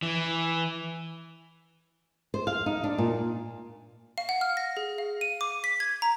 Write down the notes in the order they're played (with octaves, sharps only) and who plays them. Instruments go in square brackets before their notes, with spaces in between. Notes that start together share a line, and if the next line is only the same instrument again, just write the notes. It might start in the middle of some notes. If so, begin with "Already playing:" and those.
[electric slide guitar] E3
[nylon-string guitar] C5
F5
D#4
D4
A#2
[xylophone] F5
F#5
F6
A#6
G#4
F5
D#7
D6
B6
G#6
A#5